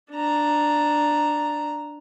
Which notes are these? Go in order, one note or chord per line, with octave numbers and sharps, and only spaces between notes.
D4 A#5